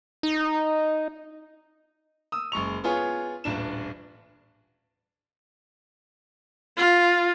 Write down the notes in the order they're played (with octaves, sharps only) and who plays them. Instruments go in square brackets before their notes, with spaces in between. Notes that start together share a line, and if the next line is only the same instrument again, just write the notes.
[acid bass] D#4
[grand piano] D#6 E6
F#1 G#3 C#6 F7
B3 F4 G#4 C#5
D#1 A1 D4 E7
[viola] F4